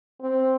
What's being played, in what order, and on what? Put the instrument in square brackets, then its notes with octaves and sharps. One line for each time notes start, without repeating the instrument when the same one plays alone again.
[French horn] C4